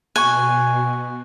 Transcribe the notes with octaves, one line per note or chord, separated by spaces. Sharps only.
B2 G#5 C#6 F#6